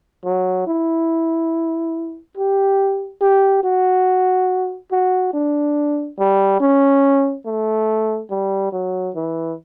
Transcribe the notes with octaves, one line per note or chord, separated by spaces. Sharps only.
F#3
E4
G4
G4
F#4
F#4
D4
G3
C#4
A3
G3
F#3
E3